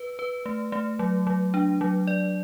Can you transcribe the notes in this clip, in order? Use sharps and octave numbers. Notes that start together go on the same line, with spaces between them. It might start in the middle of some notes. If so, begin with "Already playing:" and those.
Already playing: B4
B4
A3
A3
F#3
F#3
D4
F#3
D5